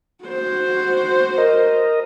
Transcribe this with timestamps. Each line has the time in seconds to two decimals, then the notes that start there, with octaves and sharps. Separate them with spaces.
0.25 F#4 C5
1.38 A#4 D#5